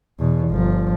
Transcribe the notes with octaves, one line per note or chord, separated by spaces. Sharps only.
E2 B2
G1 F3